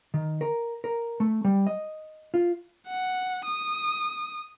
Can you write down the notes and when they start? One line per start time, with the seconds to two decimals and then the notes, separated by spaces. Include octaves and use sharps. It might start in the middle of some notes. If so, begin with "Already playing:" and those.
0.14 D#3
0.41 A#4
0.84 A#4
1.20 A3
1.45 G3
1.67 D#5
2.34 F4
2.87 F#5
3.45 D#6